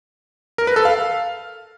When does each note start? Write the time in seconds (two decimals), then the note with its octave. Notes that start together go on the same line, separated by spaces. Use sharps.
0.58 A#4
0.67 B4
0.76 A4
0.85 F5